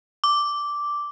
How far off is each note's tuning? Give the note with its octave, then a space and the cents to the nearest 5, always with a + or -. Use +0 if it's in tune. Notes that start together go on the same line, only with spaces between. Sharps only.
D6 -5